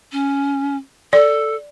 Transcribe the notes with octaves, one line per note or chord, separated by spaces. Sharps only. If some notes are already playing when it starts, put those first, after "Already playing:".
C#4
A4 D5